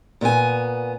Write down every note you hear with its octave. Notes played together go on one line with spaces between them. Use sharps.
A#2 B3 A#4 G#5